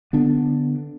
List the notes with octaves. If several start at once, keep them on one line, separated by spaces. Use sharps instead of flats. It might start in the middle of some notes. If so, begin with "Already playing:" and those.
D3 B3 D4